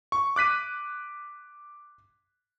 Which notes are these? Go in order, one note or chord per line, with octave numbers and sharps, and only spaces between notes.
C#6
D6 F#6 B6 D#7